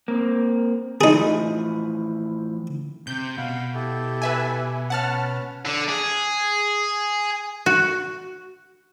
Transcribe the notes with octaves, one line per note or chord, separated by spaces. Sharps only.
A#3 C4
A2 E3 F3 D#4 G#4
C3 G6
B2 F5 F#5 B5
E4 G4 A4
B4 E5 G#5
C#4 B4 F#5 A5 F6
D3
G#4
F#4